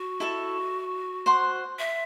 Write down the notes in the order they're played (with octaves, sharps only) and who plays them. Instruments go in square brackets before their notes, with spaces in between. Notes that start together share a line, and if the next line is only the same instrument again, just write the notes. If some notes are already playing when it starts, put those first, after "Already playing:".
Already playing: [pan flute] F#4
[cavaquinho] E4 A4 E5 A5
C5 F#5 C6
[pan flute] E5